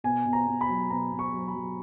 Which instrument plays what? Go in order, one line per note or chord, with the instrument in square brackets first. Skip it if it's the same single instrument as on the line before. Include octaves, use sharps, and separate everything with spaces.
[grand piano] B2 G#5
B2
A#5
B2
B5
F#3
B2 A#5
B2
C#6
F#3
B5
F#3